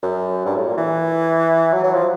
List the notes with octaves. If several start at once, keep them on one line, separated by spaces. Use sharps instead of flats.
F#2
G2
A2
A#2
E3
F#3
F#3
F3